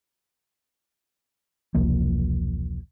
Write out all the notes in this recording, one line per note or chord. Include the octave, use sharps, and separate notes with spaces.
E1 C2 F3 A#3